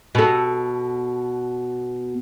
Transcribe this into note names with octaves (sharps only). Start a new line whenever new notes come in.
B2 A4